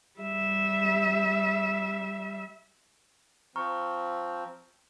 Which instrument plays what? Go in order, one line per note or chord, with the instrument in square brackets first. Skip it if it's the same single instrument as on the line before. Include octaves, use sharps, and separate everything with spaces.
[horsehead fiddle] G3 E5
[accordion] F3 C4 [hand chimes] A#5 C#6 F6